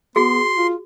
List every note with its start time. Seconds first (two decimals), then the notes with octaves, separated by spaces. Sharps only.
0.16 B3 F#4 G#4 C6
0.57 F4